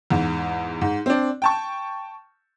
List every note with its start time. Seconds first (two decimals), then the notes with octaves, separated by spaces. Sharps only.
0.10 E2 G#2
0.81 G#2
1.06 C4 D4
1.42 G5 A5 C#6